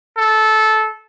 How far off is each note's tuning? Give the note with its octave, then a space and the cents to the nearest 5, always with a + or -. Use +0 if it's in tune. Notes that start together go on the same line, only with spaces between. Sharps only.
A4 -15